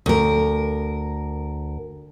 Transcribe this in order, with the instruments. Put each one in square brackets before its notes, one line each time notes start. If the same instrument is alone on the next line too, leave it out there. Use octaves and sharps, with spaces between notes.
[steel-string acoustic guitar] D2 A#4